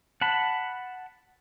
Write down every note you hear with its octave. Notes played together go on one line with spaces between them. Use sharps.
F#5 A5 B5